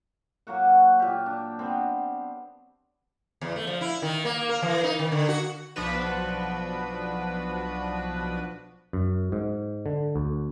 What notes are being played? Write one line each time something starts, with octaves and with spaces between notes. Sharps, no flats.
F#3 A#3 F#4 F#5
A#2 G4
D4
B3 C4
E2
A3
F3
E4
D#3
A#3
A#4
E3
D#4
D#3
D3
F#4
B1 F3 B3 D4 F#4 B4
F#2
G#2
D3
D2